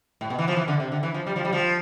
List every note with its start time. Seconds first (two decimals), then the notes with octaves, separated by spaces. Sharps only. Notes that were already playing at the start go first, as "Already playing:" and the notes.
0.21 A2
0.30 B2
0.39 E3
0.48 F3
0.56 E3
0.68 D3
0.80 C3
0.92 D3
1.03 E3
1.14 F3
1.27 G3
1.36 F3
1.45 G3
1.53 F3